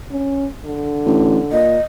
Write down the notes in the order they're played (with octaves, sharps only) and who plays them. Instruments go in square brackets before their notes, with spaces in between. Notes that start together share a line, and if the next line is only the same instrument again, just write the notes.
[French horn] C#4
D3
[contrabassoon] A1
[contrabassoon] A#2 [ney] D#5